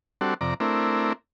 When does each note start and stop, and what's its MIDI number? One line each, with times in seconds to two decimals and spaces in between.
0.21 0.34 55
0.21 0.34 60
0.21 0.34 62
0.21 0.34 66
0.21 0.34 69
0.41 0.54 41
0.41 0.54 48
0.41 0.54 74
0.41 0.54 82
0.60 1.13 57
0.60 1.13 60
0.60 1.13 62
0.60 1.13 64
0.60 1.13 70